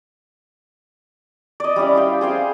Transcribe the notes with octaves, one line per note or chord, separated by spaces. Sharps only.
D5 D#5
G3 C#4 E4
G4 F5 G5
G#4 C5 F5 G#5